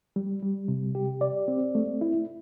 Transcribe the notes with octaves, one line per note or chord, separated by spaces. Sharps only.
G3
G3
C3
G4
D5
C4
A3
E4